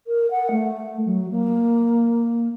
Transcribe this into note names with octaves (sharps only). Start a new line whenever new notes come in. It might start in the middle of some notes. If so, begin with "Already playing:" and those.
A#4
F#5
A3
F#3
A#3